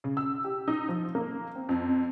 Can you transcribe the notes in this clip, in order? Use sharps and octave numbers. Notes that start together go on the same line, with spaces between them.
C#3
E6
G4
D#4
F3
A#3
C4
F2